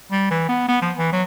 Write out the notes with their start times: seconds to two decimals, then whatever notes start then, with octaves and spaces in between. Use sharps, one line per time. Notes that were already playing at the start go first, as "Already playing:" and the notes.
0.12 G3
0.31 E3
0.49 B3
0.69 B3
0.82 F3
0.98 E3
1.13 F#3